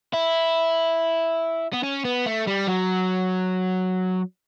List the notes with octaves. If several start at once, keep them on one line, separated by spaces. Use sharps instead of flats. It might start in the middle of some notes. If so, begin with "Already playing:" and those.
E4
B3
C#4
B3
A3
G3
F#3